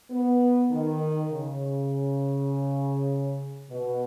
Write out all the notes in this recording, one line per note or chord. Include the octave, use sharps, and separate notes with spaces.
B3
D#3
C#3
B2